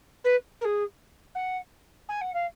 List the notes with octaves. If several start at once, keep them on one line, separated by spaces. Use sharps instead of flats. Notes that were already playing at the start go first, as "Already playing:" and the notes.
B4
A#4
G#4
F#5
G#5
F#5
F5